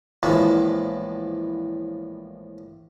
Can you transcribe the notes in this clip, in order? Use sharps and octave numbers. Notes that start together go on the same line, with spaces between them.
A#1 E2 A2 F3 G#3